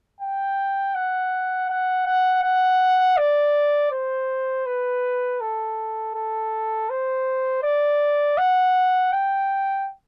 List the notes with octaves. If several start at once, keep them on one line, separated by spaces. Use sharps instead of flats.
G5
F#5
F#5
F#5
F#5
D5
C5
B4
A4
A4
C5
D5
F#5
G5